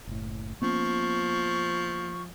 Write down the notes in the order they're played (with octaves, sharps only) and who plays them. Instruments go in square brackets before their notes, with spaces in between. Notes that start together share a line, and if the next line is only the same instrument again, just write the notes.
[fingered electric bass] F#1 A2
[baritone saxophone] F3 [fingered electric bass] A#3 B3 C#4 [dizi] C#6